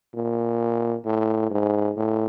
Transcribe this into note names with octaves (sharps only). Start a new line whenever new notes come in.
A#2
A2
G#2
A2